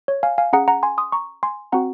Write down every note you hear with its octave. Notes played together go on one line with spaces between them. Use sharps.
C#5
F5 G#5
F5 G#5
C#4 G#4 F#5 A#5
F#5 A#5
G#5 C6
C6 D#6
A#5 C#6
G#5 C6
C4 F#4 F#5 A#5